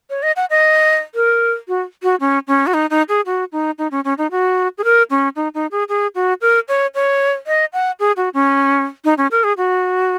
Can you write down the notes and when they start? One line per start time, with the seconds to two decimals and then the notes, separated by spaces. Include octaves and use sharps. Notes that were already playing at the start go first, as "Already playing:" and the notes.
0.10 C#5
0.23 D#5
0.36 F#5
0.50 D#5
1.15 A#4
1.68 F#4
2.03 F#4
2.20 C#4
2.48 C#4
2.67 F#4
2.74 D#4
2.90 D#4
3.09 G#4
3.26 F#4
3.52 D#4
3.78 D#4
3.91 C#4
4.05 C#4
4.18 D#4
4.31 F#4
4.78 G#4
4.84 A#4
5.10 C#4
5.36 D#4
5.54 D#4
5.71 G#4
5.89 G#4
6.15 F#4
6.41 A#4
6.68 C#5
6.95 C#5
7.47 D#5
7.73 F#5
8.00 G#4
8.17 F#4
8.34 C#4
9.05 D#4
9.18 C#4
9.31 A#4
9.44 G#4
9.57 F#4